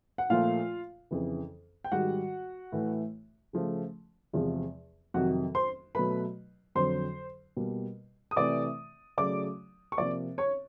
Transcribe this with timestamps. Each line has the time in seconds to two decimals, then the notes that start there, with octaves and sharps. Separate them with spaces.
0.18 F#5
0.30 A#2 F3 A3 F4 F5
1.11 F2 C#3 E3
1.84 G5
1.92 G#2 D#3 G3 F#4 F#5
2.72 A2 E3 A3
3.53 C#3 F3 A3
4.33 E2 C3 F3 G#3
5.14 F2 C3 D#3 F#3 F#4 F#5
5.55 C5 C6
5.95 B2 F#3 A3 B4 B5
6.75 F2 D3 F#3 C5 C6
7.57 B2 G3 A#3
8.31 D#6
8.36 C3 E3 A3 D5 D6
9.18 C#3 F#3 A3 D5 D6
9.92 C#6
9.98 C3 F3 A#3 D5 D6
10.38 C#5 C#6